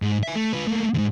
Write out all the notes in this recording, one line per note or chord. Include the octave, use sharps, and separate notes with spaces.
G#2
E5 G#5
A3
F4 B4
A3 A#3
D2 G#2